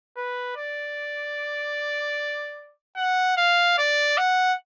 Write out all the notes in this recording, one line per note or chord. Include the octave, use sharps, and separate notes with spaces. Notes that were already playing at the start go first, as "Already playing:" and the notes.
B4
D5
F#5
F5
D5
F#5